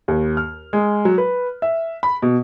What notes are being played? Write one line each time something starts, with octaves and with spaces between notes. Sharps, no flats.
D#2
F6
G#3
F#3
B4
E5
B5
B2